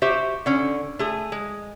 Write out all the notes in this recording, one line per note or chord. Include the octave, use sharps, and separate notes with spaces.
F#4 G4 C5 E5
D3 C#4
A3 G#4
G#3